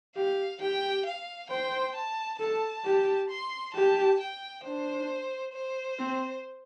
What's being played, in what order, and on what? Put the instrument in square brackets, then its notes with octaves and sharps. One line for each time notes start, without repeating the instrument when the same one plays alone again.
[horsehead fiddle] G4 [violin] F5
[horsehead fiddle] G4 [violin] G5
[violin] F5
[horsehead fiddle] C5 [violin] G5
[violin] A5
[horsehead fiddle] A4 [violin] A5
[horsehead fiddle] G4
[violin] C6
[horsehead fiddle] G4 [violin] A5
[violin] G5
[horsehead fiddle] D4 [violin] C5
[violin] C5
[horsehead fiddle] C4